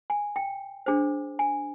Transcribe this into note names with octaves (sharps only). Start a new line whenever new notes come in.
G#5
G5
D4 G#4 C5
G#5